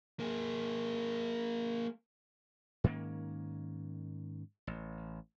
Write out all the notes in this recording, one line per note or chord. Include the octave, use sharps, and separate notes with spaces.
A#3 G#4
G#2 D#3 A#3 C#4
A1